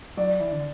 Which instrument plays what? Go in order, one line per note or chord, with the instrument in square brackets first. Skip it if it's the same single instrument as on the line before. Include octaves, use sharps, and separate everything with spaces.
[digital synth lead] F#3 [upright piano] D5
[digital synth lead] E3
D3